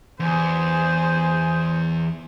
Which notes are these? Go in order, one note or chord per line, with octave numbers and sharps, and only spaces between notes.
E2 G#4 C5